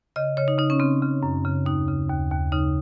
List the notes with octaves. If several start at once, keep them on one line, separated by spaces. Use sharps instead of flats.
C#3 D#5
C#3 C#5
D#4
C#3 D#4
C#4
C#3 C4
C#3
F#2
C#3
D#2 D#4
C#3
D#2
D#2
C#3 D#4